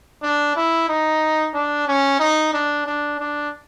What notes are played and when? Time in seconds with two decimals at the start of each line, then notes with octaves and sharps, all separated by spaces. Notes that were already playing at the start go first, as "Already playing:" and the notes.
0.23 D4
0.56 E4
0.89 D#4
1.54 D4
1.88 C#4
2.20 D#4
2.54 D4
2.86 D4
3.20 D4